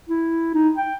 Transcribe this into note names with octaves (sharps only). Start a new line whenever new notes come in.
E4
D#4
G5